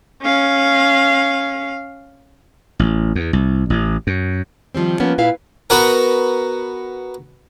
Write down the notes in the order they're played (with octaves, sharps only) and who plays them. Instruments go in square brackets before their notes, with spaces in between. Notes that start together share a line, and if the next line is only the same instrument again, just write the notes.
[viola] C#4 F5
[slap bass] A1
E2
C2
A1
F#2
[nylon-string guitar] D#3 F3 G3 C4
F3 A#3 B3 C#4
A#2 E4 B4 F5
[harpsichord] B3 F#4 A#4